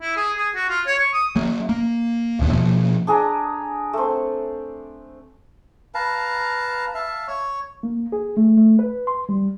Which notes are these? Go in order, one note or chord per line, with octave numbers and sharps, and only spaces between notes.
E4
G#4
G#4
F#4
F4
C#5
C#6
D#6
F#3 A#3
A#3
D1 D#2 D3 B3
B2 F3 A#3
D4 G#4 D5 A#5
A3 C4
B4 F5 A5 A#5
E5 F5 A5
C#5 C#6
A#3
G#4
A3
A3
B4
C6
G3